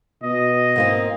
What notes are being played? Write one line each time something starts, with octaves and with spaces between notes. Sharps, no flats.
B2 D#5
G#2 A#3 C4